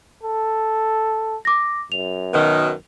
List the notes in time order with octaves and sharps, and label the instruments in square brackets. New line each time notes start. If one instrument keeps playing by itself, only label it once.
[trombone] A4
[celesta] D6 A#6
[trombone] F#2 [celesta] F7
[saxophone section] B2 D#3